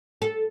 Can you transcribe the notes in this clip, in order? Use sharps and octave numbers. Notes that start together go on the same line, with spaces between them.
A4